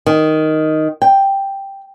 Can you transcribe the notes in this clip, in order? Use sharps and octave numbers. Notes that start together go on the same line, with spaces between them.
D#3
G5